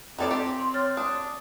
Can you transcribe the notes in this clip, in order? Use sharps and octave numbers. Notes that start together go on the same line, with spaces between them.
F2 D#3 A4 D5
C4 G4
C6
C#5 F6 A6
D4 D#6